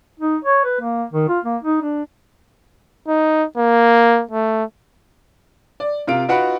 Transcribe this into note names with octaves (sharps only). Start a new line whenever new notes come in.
D#4
C#5
B4
A#3
D#3
F4
A#3
D#4
D4
D#4
A#3
A3
D5
C3 F4 A#4 F5 D7
D#4 F4 F#4 B4 F#5 B5